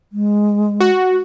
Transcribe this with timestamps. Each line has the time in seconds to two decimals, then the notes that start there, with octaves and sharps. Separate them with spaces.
0.12 G#3
0.80 F#4